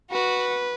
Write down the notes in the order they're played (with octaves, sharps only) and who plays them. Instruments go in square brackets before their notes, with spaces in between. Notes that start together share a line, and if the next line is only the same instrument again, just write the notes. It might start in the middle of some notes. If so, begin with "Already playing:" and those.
[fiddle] F#4 [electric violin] B4